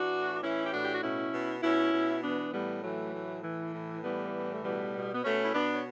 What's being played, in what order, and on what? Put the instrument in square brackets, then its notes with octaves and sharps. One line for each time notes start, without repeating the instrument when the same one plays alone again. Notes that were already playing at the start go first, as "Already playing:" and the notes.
Already playing: [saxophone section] E3 D4 F#4
A2
E3 C#4 E4
G4
A2 D4 F#4
G4
F#4
B2 C#4 E4
B2
B2 C#4 E4
B2
E3 B3 D4
A2 G3 B3
E3 F#3 A3
A2
E3
A2
E3 G3 B3
A2
A3
B2 G3 B3
B2
B3
B2 A3 C#4
E4
B2 B3 D4
C#5